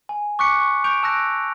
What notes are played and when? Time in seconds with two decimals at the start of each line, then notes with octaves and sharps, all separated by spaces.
0.09 G#5
0.39 C#6 D6 F#6 B6 C#7
0.60 C#6
0.84 C#6 G6 D7 F7
1.03 A5 E6 F#6 A#6 D7